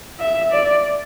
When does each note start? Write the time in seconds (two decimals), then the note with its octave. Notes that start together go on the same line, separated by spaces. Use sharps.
0.20 E5
0.52 D5